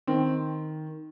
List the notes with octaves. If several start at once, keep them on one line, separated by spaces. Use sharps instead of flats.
D#3 C4